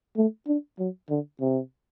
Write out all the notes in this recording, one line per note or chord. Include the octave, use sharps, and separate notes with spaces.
A3
D4
F#3
D3
C3